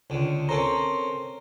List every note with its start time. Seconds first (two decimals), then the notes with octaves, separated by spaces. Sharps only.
0.10 C#2 D3
0.49 C4 C#4 A4 A#4 C5 A#5